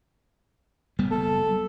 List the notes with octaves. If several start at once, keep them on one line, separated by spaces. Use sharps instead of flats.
F#1 G3 B3
A4